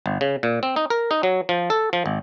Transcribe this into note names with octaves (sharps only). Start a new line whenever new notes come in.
G1
C#3
A#2
C4
D#4
A#4
D#4
F#3
F3
A4
F3
G#1